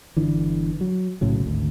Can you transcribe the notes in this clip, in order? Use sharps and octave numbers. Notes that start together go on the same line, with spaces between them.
G1 D3 E3
F#3
B1 A2 C#3 F#3
G#1 D2